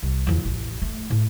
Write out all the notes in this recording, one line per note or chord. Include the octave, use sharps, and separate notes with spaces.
C2
E2 F3
A1
A3
A2